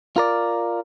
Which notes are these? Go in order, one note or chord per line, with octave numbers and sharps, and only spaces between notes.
F4 A#4 D5